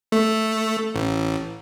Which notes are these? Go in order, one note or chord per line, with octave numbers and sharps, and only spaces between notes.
A3
A1